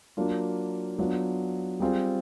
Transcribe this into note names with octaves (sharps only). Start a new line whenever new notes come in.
F#3 A#3 D4 F4
F#3 B3 D4 F4
G3 C4 F4 G#4